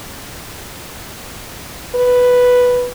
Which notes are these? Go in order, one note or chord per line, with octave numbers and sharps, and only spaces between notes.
B4